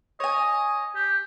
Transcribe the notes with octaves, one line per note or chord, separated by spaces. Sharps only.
C#5 D#5 G#5
G4